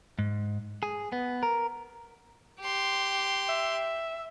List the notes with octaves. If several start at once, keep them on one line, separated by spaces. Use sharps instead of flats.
G#2
G#4
B3
A#4
G4 C6
E5